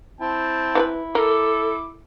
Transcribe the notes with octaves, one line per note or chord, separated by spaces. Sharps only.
C4 E4 G5 A5
E3 A4 B4
A4 A#4 D6